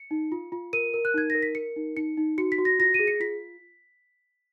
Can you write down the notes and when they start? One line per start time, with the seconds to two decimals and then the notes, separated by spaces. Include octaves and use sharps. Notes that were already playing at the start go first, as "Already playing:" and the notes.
Already playing: C#7
0.11 D#4
0.32 F4
0.52 F4
0.73 A#4 D#7
0.94 A#4
1.05 F#6
1.14 D#4 G#6
1.30 A#4 A#6
1.43 B6
1.55 A#4 C#7
1.76 D#4
1.96 D#4 C#7
2.17 D#4
2.38 F#4 C#7
2.52 B6
2.58 F#4
2.65 A#6
2.79 F4 A#6
2.94 G#4 D#7
3.08 C#7
3.20 F4 B6